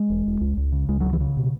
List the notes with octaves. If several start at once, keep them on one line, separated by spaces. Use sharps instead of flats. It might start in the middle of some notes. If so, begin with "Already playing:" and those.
Already playing: G#3
E1
E1
C#2
C#2
C#3
C#2 G#3
F#3
C#3
E3
C#3
B2